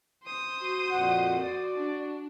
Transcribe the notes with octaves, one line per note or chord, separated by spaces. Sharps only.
C5 D#6
F#4
F2 A#2 F#5
D5
D4